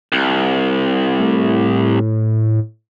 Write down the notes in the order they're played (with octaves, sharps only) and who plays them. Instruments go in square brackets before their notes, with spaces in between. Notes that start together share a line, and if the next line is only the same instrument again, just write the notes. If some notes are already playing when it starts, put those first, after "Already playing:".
[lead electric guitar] C2
[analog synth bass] A2